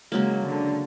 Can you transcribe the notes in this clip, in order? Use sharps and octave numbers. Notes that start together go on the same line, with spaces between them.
C#3 F#3 G#3 A#3
D3